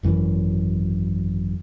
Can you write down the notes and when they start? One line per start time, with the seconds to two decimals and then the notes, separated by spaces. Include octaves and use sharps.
0.03 G#1 F#2 E3